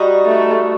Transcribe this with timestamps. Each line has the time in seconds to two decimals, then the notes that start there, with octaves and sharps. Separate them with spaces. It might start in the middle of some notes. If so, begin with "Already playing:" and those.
Already playing: G3 D#4 F#4
0.26 A3